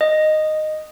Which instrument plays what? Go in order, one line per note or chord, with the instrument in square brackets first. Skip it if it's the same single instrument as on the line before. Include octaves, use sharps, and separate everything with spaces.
[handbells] D#5